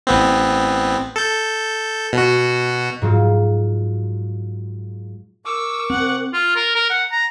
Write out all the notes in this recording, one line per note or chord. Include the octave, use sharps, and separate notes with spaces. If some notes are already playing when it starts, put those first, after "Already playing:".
A1 B3 C4
A4 G6
B2 F#4
G#2 F#3 F4
A#4 C#6 D6 E6
C4 F#5
F4
A#4
A#4
F#5
A#5